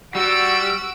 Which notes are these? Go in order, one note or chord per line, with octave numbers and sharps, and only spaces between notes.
G3 F#4 E6 D7